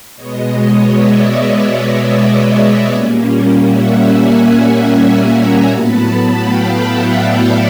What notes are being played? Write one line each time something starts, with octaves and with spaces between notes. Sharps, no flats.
B2 G#3 B3 C#5 D#5
C#5 D#5
D5 E5
A#2 G3 A#3 C#4
E5 F#5
F#5 G#5
F#5 G#5
G#5 A#5
A2 F#3 B3 A5 B5
F5 G5
E5 F#5
D5 E5